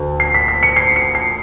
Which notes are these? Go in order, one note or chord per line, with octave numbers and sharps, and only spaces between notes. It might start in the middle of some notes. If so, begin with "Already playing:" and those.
Already playing: D2
C7
B6
B6
C#7
C7
C#7
C7